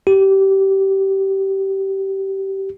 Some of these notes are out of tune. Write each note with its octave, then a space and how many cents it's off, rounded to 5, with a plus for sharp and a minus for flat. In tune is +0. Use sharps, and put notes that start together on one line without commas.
G4 -20